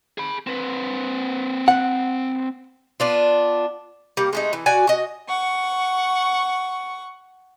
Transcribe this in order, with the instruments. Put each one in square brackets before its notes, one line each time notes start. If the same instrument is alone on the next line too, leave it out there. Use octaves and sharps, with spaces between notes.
[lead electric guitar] G#4 B5
C4 B4
[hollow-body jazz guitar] F#5
[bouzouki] B3 D4 F4
G3 A#3
G#3 A3 D#4
E3
F#4 D5 G#5
F#4 D#5
[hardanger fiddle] F#5 C#6